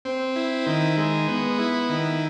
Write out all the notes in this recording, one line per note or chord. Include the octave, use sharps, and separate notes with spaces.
C4
E4
D#3
G#3
B3
E4
D#3